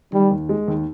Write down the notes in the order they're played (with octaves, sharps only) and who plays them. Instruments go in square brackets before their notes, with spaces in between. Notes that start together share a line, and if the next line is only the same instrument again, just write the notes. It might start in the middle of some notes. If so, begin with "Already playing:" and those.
[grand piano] D#3 [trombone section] G3
[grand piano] D#2
G#3
D#2